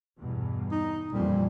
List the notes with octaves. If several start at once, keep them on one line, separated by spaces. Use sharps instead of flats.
E2 G2 B2
D#4
F2 A#2 E3 G3